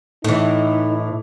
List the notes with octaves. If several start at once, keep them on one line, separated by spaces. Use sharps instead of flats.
A2 E3 D#4